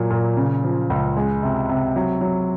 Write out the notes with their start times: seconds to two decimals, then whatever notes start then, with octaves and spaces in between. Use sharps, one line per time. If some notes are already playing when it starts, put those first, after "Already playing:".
Already playing: A#2 F#3
0.10 A#2
0.37 C#3
0.64 F3
0.90 C#2
1.17 G#3
1.43 C3
1.69 C3
1.96 F#3
2.21 F#3